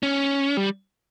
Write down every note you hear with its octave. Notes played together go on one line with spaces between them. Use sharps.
C#4
G3